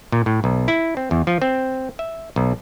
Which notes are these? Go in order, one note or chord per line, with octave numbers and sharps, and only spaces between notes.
A#2
A2
B1
E4
C4
E2
F3
C4
E5
B1